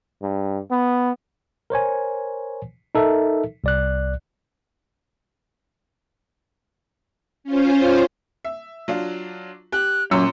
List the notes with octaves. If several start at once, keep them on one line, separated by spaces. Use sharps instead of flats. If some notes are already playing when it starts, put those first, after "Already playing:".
G2
B3
A#4 C5 C#5 G#5
D#4 A4 A#4 E5
C2 D5 F#6
C#4 F4 C5
E5
F#3 D4 F4
G4 F#6
F#2 A#2 C6 E6 C#7